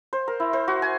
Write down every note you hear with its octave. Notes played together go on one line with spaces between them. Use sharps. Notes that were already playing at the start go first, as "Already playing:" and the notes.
C5
A#4
E4
C5
F#4
G#5